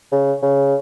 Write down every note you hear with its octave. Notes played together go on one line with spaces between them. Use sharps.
C#3
C#3